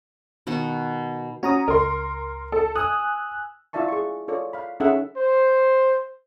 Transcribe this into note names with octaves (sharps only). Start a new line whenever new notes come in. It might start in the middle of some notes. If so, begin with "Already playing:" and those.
B2 D#3 F#5
C#4 F#4 A#5 D#6
C#2 A#4 C6
A4
G#5 D#6 E6 F#6
E4 F4 D5 E5 A5 C#6
G#4 C#6
F4 A4 C#5 D5
F5 B5
C#4 D#4 G#4 A4 E5 F#5
C5